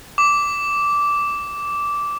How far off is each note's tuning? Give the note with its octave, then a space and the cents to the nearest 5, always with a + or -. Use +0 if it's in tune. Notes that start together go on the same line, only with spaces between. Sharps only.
D6 -10